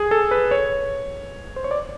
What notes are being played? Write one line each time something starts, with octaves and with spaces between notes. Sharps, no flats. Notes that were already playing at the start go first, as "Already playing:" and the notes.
Already playing: G#4
A4
B4
C#5
C5
C#5
D5